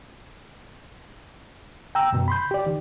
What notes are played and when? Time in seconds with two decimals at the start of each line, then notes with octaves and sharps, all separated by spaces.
1.95 G5 A#5 E6
2.12 F#2 B2
2.28 B5 C6 G6
2.51 G4 D5
2.66 D#3